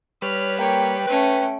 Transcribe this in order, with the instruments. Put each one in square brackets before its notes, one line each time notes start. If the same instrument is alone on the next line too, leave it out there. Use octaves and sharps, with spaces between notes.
[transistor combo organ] G3 B4 [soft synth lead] C#5 [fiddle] F6
[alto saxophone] A#3 [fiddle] C#5 [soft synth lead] G5
[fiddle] A3 C#4 [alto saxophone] B4